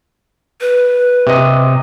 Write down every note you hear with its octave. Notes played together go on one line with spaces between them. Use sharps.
B4
C3 D#5